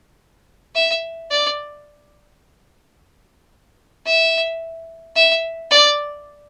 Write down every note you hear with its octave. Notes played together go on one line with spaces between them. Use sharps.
E5
D5
E5
E5
D5